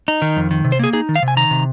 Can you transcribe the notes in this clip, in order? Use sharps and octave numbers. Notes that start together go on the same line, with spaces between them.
D#4
D#3
F2
D#3
C3
C5
A#3 G#4
D#4 G#4
D#3
F5
C3
G#5
D#3 A#5
C3